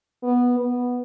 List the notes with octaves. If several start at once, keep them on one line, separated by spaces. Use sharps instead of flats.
B3
B3